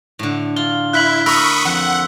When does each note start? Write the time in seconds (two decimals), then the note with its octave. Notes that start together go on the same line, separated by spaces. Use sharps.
0.19 A2 D3
0.56 F4 G7
0.93 E4 F#6 B6 F#7
1.26 A#4 B5 C#6 D#6 E6
1.65 F2 F#5